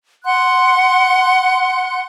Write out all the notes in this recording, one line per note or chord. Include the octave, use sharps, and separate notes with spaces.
F#5 C6 F#6